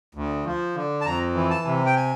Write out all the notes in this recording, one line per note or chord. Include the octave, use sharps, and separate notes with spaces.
D2
F3
D3
A5
F2 A#5
E3
A5
C3
G5
G#5